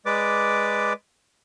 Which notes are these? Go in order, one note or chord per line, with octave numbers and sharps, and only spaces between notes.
G#3 B4 D5 D6